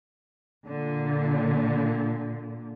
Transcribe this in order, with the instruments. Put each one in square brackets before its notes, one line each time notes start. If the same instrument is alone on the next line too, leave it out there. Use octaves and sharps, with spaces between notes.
[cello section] A#2 D3